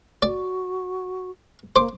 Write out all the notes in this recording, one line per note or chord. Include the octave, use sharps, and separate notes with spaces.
F#4 D5
A#3 C5 D6